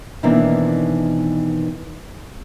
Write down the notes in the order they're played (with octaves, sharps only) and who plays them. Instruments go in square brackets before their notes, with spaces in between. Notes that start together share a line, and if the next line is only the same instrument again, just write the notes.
[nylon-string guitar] B2 D#3 E3 A#3 C4 D4